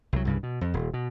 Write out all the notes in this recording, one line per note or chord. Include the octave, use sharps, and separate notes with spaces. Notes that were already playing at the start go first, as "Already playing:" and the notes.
C2 F#3
C2 G2 C#3
B2
F2
D#1
B2